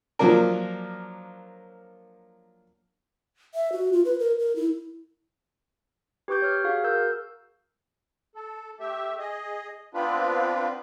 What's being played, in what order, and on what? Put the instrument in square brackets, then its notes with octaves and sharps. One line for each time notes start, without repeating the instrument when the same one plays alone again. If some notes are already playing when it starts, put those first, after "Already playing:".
[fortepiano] F3 F#3 A#3 D4 A#4
[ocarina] E5
F#4
F4
B4
A#4
A#4
E4
[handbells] G4 B4 C#6 D6 G6
C#5 F6
F#4 G#4 F5
A#4 E6 G6
[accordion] A4
A3 G4 E5
G#4 D#5
B3 C4 D4 F4 B4